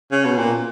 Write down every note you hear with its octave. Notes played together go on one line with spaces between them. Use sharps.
C#3
B2
A#2